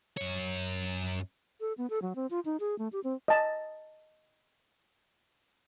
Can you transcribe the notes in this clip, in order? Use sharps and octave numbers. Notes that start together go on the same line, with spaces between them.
F#2 C#5
A4
B3
A4
F#3
C4
F4
D#4
G#4
A3
G4
C4
D#5 A5